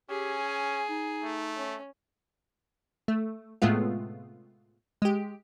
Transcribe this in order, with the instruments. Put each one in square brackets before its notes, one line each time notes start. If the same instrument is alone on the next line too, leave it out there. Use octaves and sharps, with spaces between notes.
[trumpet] C#4 [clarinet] G4 [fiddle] G#4
[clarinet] G#5
D#4
[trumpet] A3
[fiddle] C#4
[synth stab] A3
A2 C3 G#3 A3 B3 F4
G#3 G4